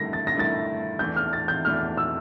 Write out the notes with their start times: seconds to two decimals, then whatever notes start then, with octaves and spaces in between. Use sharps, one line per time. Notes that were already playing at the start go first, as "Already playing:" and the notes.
Already playing: G2 D3 A3 E4 A#4 A#6
0.13 A6
0.27 A#6
0.34 G2 D3 A3 E4 A#4 A6
0.99 E2 E3 A3 D4 G6
1.16 F6
1.33 A6
1.48 G6
1.65 E2 E3 A3 D4 F6
1.97 E6